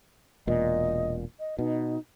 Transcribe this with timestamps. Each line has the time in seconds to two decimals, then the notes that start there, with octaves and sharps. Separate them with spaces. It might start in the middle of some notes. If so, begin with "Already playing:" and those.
0.47 E1 A#2 D#5
1.39 D#5
1.59 B2 D#4